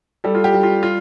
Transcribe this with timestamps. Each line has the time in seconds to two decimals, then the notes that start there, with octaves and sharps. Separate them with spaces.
0.24 G3 A4
0.35 F4
0.44 G4
0.54 G3
0.63 F4
0.83 F4